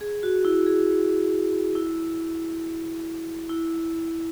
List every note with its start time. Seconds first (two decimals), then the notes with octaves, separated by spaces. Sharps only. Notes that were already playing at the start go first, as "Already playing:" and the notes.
0.01 G#4
0.23 F#4
0.45 E4
0.66 G#4
1.75 E4
3.49 E4